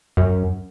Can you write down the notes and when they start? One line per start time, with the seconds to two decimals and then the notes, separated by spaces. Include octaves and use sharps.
0.17 F#2